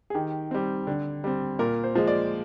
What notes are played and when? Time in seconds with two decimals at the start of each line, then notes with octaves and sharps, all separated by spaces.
0.10 G#4
0.14 D#3 G4
0.51 G3 C4
0.87 D3
1.24 G3 C4
1.59 A#2 A#4
1.84 C5
1.95 F3 G#3
2.07 D5